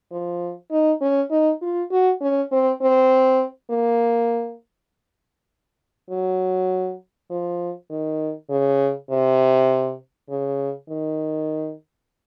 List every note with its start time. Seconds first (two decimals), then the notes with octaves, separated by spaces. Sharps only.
0.11 F3
0.71 D#4
1.01 C#4
1.31 D#4
1.62 F4
1.91 F#4
2.21 C#4
2.52 C4
2.82 C4
3.71 A#3
6.10 F#3
7.30 F3
7.90 D#3
8.50 C#3
9.10 C3
10.30 C#3
10.89 D#3